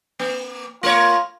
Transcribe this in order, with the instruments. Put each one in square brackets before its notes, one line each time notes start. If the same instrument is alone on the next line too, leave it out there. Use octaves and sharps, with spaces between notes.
[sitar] A#3
[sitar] A3 A#4 C#5 [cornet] F4